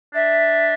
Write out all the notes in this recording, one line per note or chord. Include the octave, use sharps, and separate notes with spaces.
D4 E5